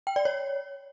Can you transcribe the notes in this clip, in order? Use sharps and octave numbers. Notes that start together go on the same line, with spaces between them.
G5
D5
C#5